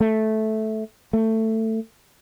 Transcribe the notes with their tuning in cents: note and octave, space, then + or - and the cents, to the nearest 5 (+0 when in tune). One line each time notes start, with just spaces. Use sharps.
A3 -10
A3 +15